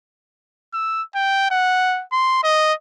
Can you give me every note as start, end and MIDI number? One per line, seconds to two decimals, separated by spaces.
0.74 1.02 88
1.15 1.50 79
1.51 2.03 78
2.12 2.38 84
2.44 2.74 75